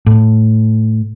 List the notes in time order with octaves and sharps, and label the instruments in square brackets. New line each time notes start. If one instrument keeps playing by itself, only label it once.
[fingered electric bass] A2